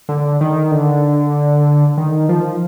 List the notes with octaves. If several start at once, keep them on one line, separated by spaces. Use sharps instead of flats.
D3
D#3
D3
D#3
F3